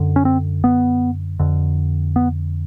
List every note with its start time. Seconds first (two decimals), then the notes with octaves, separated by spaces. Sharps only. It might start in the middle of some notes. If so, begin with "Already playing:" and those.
Already playing: F#2 D3
0.16 C#4
0.25 C4
0.64 B3
1.40 F2 D3
2.16 B3